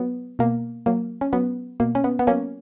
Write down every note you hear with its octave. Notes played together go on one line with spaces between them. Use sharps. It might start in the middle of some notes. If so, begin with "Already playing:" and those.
Already playing: F#3 B3
B2 A#3
F#3 A#3
C#4
F#3 B3
B2 A#3
C#4
B3
B3
F#3 A#3 C#4